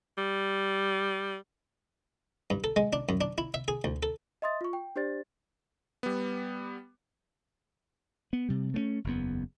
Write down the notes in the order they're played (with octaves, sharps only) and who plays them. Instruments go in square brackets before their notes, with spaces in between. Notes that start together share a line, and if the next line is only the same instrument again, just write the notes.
[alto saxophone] G3
[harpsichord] G2
A4
G#3
D4
F#2
D4
E4
E5
G#4
D2
A4
[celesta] D#5 E5 C6 D#6 A6
F4 C#6
G5
D4 G4 C5 D5 A6
[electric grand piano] G3 B3
[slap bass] B3
C3 G3
A3 A#3 C#4
F#1 E2 B3